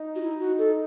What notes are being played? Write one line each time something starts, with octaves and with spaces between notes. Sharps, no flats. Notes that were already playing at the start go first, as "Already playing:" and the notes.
Already playing: D#4
F#4
E4
F#4
A4